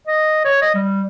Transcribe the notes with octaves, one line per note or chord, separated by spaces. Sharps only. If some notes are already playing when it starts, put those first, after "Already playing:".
D#5
C#5
D#5
G3